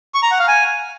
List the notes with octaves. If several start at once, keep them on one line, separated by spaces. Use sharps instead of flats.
C#6
A#5
F#5
F5
G#5